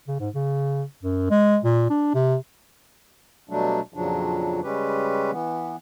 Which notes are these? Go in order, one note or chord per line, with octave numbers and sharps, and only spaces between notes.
C#3
G#2
C#3
F#2
G#3
A#2
D4
C3
B2 F#3 G3 A3 D4
F2 A#2 C#3 F3 F#3 D4
C#3 G3 G#3 C#4 G4 B4
E3 B3